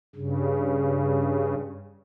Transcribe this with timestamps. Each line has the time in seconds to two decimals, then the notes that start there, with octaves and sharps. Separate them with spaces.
0.16 G2 C#3